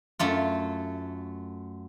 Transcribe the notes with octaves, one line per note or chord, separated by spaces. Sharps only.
F#2 A3 F4